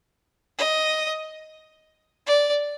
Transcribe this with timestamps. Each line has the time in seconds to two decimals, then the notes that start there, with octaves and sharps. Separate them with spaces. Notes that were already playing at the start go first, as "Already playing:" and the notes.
0.58 D#5
2.26 D5